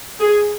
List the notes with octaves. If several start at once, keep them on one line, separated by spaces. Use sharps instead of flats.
G#4